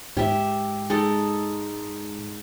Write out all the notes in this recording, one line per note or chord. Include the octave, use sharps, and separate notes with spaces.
G#2 G4 E5
G#3 D#4 A4